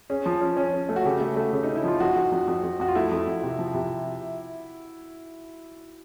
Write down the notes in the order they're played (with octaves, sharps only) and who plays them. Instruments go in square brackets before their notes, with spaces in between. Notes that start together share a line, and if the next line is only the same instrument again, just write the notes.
[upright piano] C#4 [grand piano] G#4
[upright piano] F3
C#4
C#4
C#4
A3
[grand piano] F#4
[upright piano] C#3 [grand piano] G4
[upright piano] A3
A3
C#3
[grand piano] D#4
[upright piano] C#4
[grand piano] E4
[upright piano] F3 [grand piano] F4
[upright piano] F2 [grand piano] F#4
[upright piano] F2
F2
F2
F2
[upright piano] F2 [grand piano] F#4
[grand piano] F4
[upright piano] A3 [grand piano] E4
[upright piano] F2
F2
C3
F3
C3